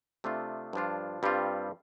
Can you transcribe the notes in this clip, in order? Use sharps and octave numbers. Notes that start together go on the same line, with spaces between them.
C3 A3 D4 F4
G2 F3 D4 F4
G2 G3 C4 F4